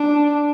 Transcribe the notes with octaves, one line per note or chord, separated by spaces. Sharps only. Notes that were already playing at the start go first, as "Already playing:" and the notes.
Already playing: D4